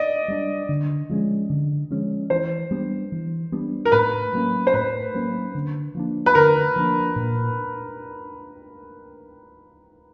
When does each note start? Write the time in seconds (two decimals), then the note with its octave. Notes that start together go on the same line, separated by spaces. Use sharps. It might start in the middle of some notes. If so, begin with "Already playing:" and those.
Already playing: D5 D#5
0.28 G3 B3 D4
0.69 D3
1.10 F3 G#3 C#4
1.50 D3
1.91 F3 G#3 C#4
2.30 E3 C5
2.71 G3 B3 D4
3.12 E3
3.52 G3 B3 D4
3.85 A#4
3.92 A2 B4
4.33 F#3 A#3 C#4
4.67 C5
4.74 A2 B4
5.14 F#3 A#3 C#4
5.55 D3
5.95 F3 A#3 D4
6.26 B4
6.35 D3 A#4
6.76 F3 A#3 D4
7.16 A#2